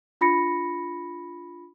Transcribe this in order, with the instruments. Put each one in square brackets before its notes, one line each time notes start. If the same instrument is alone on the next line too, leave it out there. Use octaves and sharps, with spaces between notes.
[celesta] D4 F4 B5 A#6 C#7